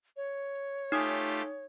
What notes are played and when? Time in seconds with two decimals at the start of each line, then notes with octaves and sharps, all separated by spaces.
0.17 C#5
0.92 A3 D#4 F4 G4 D#6